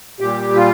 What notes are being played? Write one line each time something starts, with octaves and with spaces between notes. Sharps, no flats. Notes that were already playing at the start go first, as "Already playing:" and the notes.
A#2 G3 G4
F4